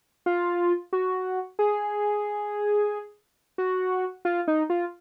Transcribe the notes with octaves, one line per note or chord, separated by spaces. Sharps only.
F4
F#4
G#4
F#4
F4
D#4
F4